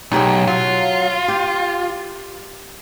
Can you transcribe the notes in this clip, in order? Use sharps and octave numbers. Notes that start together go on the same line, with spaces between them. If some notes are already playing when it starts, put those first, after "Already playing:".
B1 D#4 G4 G#4
F#3 F4
G4